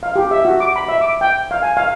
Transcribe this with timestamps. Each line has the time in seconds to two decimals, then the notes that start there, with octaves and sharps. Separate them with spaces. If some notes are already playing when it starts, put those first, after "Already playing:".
0.03 F5
0.16 G4
0.31 E5
0.45 F#4
0.60 D6
0.76 B5
0.88 E5
1.01 D6
1.21 G5
1.51 F5
1.63 G#5
1.77 F5